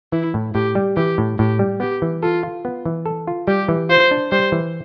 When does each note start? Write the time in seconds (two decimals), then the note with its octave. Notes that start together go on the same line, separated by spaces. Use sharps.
0.12 E3 E4
0.34 A2
0.55 A2 G4
0.75 G3
0.97 E3 G4
1.18 A2
1.39 A2 G4
1.59 G3
1.80 B3 G4
2.02 E3
2.23 F4 A4
2.43 F4
2.65 B3
2.85 E3
3.06 A4
3.27 F4
3.48 G3 G4
3.69 E3
3.89 F4 C5
4.11 D4
4.32 G3 C5
4.52 E3